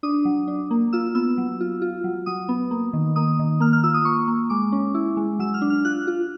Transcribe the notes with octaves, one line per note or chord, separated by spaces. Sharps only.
D4 D#6
F#3
D4
A#3
F4 E6
B3 E6
F#3
F4
F4
F#3
F#3 D#6
B3
A#3
D#3
A#3 D#6
D#3
A#3 F6
F6
F4 E6
D#6
A#3 C#6
A#3
G#3 D6
C#4
E4
G#3
F#3 E6
F6
D4
F6
F4 F#6
F4